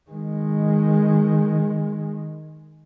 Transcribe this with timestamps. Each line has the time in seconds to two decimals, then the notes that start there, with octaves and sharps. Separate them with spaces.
0.11 D#3 G#3